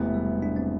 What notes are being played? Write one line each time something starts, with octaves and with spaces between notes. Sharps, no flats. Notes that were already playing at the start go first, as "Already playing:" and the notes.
Already playing: E1 E2 C3 E3 A3 B3
G3
D4
C4